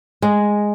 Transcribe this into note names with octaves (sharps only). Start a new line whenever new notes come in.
G#3